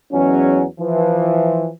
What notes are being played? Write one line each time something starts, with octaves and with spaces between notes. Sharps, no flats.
E2 F#3 G#3 C#4
E3 F3